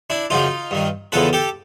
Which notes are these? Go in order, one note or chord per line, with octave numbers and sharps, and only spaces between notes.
D4 E4
F#2 C#3 F3 D#4 F4
G2 D#3
E2 C#3 F3 A4 B4
G4 A4